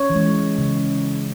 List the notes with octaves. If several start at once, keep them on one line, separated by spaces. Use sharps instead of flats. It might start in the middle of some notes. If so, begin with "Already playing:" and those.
Already playing: C#4 C#5
E3
G#3
C#3